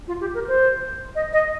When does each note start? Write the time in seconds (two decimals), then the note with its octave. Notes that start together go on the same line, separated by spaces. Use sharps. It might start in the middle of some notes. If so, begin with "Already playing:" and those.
0.08 F4
0.21 G4
0.34 A#4
0.48 C5
1.15 D#5
1.33 D#5